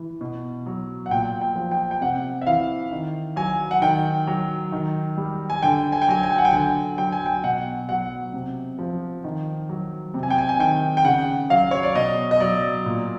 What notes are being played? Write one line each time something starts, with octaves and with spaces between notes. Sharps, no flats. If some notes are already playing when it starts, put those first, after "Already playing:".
Already playing: E3
B2
F#3
F#5
A#2 G5
G5
F3
G5
G5
C3 F#5
E5
E3 F5
D#3
F#3 G#5
F#5
D#3 G5
F#3
D#3
G3
G#5
D3 G5
G#5
G5
F#3 G#5
G#5
G5
F#5
G5
D3 G#5
F#3 G5
G#5
G5
B2 F#5
F#3 F#5
C3
F3
D#3
F#3
C3
G#5
G5
G#5
G#5
D#3 G5
G5
C#3 F#5
F#3 F5
C#5
D5
B2 D#5
D#5
F#3 D5
A#2